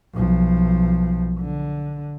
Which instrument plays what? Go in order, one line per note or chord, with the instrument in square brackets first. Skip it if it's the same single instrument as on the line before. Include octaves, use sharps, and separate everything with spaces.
[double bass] B1 F3
D3